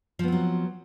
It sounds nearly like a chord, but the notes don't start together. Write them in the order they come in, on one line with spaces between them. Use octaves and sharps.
F3 B3 C4 F#3